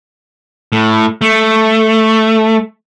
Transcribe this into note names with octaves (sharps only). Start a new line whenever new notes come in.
A2
A3